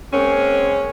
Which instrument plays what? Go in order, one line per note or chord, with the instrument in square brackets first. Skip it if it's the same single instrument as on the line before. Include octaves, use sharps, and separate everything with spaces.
[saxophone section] G#3 A#3 C4 C#4